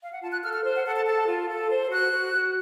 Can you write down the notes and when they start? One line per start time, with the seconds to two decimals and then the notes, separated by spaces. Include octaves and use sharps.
0.02 F5
0.12 F#5
0.22 F4 A5
0.32 F#6
0.43 A4 F6
0.53 F6
0.64 C5
0.74 F#5
0.85 A4 F#5
0.96 A5
1.06 A4 A5
1.27 F4
1.48 A4
1.70 C5
1.90 F#4 F#6
2.13 F#4
2.34 F#4